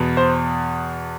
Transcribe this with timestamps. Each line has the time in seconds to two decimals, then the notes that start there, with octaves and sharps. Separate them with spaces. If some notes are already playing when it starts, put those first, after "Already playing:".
Already playing: E2 B2 B3
0.17 C5